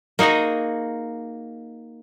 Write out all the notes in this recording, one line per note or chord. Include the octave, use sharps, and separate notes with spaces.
A#3 D#4 F#4 G#4 D#5